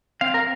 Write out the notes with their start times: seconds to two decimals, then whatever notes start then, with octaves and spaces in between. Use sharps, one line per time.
0.21 C4 F5
0.34 A#4